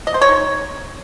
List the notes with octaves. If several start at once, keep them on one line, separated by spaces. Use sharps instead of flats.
D#5
C5
C#5
D#4